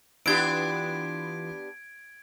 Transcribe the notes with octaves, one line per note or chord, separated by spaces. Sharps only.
E3 B3 D4 F4 G4 C6 G#6 D7